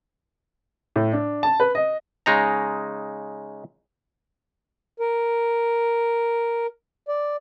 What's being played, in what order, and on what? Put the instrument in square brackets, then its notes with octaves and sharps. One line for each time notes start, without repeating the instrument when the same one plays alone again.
[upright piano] A2
D4
A5
B4
D#5
[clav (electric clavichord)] C#3 G#3 D#4 A#5
[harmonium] A#4
D5